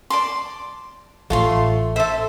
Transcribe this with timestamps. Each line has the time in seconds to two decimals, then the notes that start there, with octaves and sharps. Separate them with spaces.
0.10 D5 A5 C6
1.30 A1 A3 F4 C#5 C6
1.96 A4 C5 E5